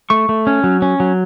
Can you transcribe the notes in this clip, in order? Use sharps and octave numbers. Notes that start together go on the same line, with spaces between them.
A3 C#6
A3
C#4
F#3
C#4
F#3